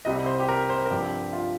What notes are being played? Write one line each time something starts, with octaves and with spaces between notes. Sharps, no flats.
C2 C3 G3 C4 D#5
C5
G4
A#4
C5
A#4
G2 F3 C4 G4
F4